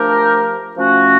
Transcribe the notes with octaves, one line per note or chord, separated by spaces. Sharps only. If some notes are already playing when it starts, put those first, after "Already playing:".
Already playing: F3 A3 D4 G4 A#4
F3 A3 C#4 F#4